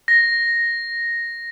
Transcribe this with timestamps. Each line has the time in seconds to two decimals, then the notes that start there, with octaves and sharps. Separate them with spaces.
0.08 A#6